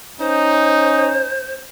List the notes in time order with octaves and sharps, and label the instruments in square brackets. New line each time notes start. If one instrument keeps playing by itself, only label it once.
[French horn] C#4 [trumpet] D#4 [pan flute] C5